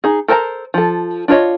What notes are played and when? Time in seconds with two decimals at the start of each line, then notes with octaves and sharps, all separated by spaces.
0.04 D#4 G#4
0.28 A4 A#4 C5 A5 A#5
0.74 F3 A4
1.28 D4 F4 B4 C#5 D#5